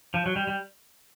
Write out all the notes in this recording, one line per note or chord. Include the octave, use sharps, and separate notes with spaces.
F3
F#3
G3
G3